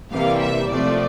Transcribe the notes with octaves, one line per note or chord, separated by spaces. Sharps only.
C3 E3 G3 A#3 F5
E5
C3 F3 A3 C4 D5